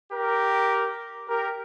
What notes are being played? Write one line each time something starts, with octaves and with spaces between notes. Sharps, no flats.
G4 A#4
G4 A#4